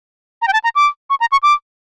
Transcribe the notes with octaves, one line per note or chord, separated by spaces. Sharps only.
A#5
G5
A5
A#5
D6
C#6
A#5
C#6
D6